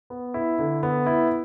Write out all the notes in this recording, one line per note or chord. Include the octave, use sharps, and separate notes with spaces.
B3
E4
D3
B3
E4